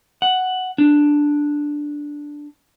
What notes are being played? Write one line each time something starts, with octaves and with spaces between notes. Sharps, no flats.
F#5
D4